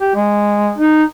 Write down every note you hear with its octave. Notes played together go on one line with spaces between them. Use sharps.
G4
G#3
D#4